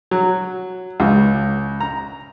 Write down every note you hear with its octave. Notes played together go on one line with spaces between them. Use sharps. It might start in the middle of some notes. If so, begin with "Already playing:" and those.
F#3
C#2
A#5